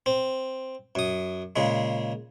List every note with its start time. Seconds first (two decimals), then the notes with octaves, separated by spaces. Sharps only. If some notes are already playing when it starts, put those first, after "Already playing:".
0.06 C4
0.95 F#2 D#6
1.56 A#2 C#3 G#3